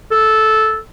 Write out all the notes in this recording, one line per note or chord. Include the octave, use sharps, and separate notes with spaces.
A4